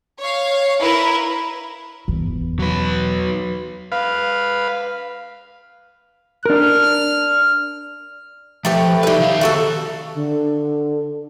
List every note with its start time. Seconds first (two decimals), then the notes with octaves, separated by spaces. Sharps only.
0.19 C#5 F5
0.81 E4 A#4 B4
2.08 E2
2.59 F#3 B4
3.92 B4 F5
6.46 D4 A#4 F6
8.65 F3 A3 G4 B4
9.03 G3 D#4 B4 E5
9.20 D#3 F5
9.41 A3 F#4 A4
10.14 D3